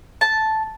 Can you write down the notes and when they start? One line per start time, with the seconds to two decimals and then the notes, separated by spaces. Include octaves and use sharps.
0.21 A5